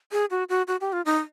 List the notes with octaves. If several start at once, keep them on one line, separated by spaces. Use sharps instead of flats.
G#4
F#4
F#4
F#4
G4
F4
D#4